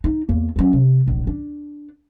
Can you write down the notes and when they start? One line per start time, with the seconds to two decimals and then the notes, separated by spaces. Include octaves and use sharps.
0.04 D#4
0.29 E2 A#3
0.56 F#3 C#4
0.73 C3
1.06 D1 A#1
1.27 D4